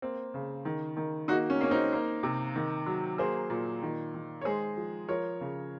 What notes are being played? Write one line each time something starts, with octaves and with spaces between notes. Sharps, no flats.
A#3 C4
C#3
D#3
D#3
A#3 D#4 F#4
C#4
A#3 C#4
C4 D#4
A#3
C3
D#3
F#3
A#3 G#4 C5
A#2
D#3
D#3
C#5
G#3 G#4 C5
F3
F3 A#4 C#5
C#3